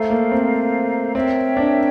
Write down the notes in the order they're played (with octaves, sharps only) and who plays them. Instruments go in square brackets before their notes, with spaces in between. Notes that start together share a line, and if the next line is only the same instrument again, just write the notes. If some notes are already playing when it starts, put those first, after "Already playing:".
Already playing: [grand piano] A3 [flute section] A4 C5 F5 A#5
[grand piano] A#3
C4
[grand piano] C4 [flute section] A#4 C#5 E5 G5
[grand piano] D4